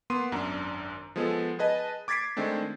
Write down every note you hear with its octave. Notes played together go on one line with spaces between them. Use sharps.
A#3 B3 C6 D#6 D#7
G#1 F#2 D4 A#5
F3 G#3 B3 G#4 A4
G#4 B4 D#5 A5
D6 G#6 A6 B6 C7 D7
D#3 G#3 A3 C4 D4